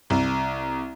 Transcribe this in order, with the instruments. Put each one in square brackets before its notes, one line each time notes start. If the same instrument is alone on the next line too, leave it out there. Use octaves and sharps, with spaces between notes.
[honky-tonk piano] C2